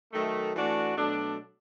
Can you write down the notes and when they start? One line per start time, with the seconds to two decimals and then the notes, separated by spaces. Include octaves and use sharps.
0.12 D#3 F#3 A3
0.54 E3 A3 D4 F#4
0.96 B2 F#3 A3 D4